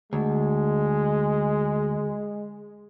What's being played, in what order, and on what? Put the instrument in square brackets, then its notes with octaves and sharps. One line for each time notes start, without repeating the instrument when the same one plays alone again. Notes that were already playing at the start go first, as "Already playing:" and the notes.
[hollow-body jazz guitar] D2 [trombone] G#3